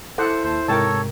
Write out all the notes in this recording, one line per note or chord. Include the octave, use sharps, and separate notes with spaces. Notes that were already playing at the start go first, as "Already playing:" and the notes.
E4 A4 C5 F#5 D6
D#2 C5 A5
G#2 C3 G#3 A4 A#4 C#5 G5 A5